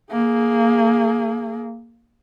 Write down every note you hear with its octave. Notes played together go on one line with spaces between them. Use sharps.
A#3 G#4